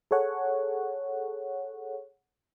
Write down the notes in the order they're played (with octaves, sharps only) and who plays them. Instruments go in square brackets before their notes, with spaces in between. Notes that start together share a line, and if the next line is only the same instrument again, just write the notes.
[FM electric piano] G#4 A4 C#5 F#5